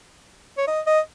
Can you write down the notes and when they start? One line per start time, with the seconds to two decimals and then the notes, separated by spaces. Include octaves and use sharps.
0.58 C#5
0.67 D#5
0.87 D#5